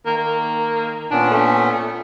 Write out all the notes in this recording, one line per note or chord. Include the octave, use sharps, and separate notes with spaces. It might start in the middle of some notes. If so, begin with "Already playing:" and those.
D#3 A#3
A#3
A#2 B3 C#4 D4
A3